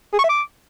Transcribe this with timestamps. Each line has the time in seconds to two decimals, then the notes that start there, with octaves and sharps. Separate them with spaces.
0.13 G#4
0.19 C#6
0.24 E5
0.29 D6